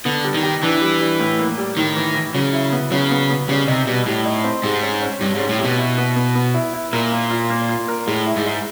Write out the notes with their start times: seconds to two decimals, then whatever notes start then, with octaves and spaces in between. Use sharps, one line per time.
0.05 D3 B3
0.24 G3
0.34 D#3
0.43 G4
0.63 E3 D4
0.82 G3
1.00 G3
1.20 A2
1.39 A#3
1.58 G3
1.77 A2 D#3
1.96 E3
2.15 E3
2.34 C#3 F#3
2.53 E4
2.72 B3
2.91 C#3 F#3
3.11 B3
3.30 B3
3.48 C#3 G3
3.68 C3 D#4
3.87 B2 G3
4.06 A2 G3
4.25 D#4
4.44 C4
4.63 G#2 C3
4.83 C#4
5.02 C#4
5.21 G2 C3
5.35 G#2 C#4
5.49 A2
5.59 C3
5.64 B2
5.78 E4
5.98 B3
6.16 B3
6.35 B3
6.54 E4
6.74 E4
6.93 A#2 A#4
7.12 A#3
7.31 F4
7.50 A#3
7.69 F4
7.88 A#4
8.07 A2 G#3
8.26 E4
8.36 G#2
8.46 G#3